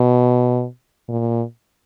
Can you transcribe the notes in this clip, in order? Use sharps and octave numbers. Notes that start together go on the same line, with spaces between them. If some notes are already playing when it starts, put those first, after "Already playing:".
Already playing: B2
A#2